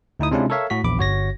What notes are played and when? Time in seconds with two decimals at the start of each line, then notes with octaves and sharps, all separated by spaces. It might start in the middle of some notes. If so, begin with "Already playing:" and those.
0.20 D2 D#4 E4 D#6
0.31 C3 G#3 C#4 D4 E4 F4
0.50 A4 A#4 C#5 E5 F5
0.70 A2 F#4 B6
0.84 A#1 E2 B5 D6
0.98 G1 F#4 C#5 A#6